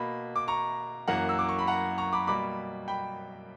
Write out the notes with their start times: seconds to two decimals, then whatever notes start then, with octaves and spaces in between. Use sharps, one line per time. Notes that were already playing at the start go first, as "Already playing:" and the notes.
Already playing: B2 A#3 B5
0.36 D6
0.48 A#5 C#6
1.08 F#2 E3 A#3 F#5 A#5
1.29 E6
1.39 D6
1.49 C#6
1.59 B5
1.67 F#5 A#5
1.98 A#5 C#6
2.13 B5 D6
2.27 B2 G3 A#3 B5 D6
2.88 G5 B5